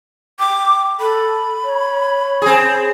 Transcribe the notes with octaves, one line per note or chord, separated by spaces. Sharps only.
G5 D6
A4 B5
C#5
C4 G#4